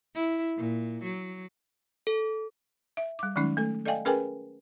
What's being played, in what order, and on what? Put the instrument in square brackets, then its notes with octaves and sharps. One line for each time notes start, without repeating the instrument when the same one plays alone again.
[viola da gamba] E4
A#2
F#3
[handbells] A4
[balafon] E5
G3 D6
D#3 F#3 G#3 C#4 D#4
A3 A4
A4 D5 D#5 F5 G5 G#5
C#4 G#4 A#4 B4 G5 G#5